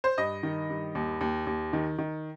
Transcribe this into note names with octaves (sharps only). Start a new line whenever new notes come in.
C5
G2 D#5
D#3
G2
D#2
D#2
D#2
D#3
D#3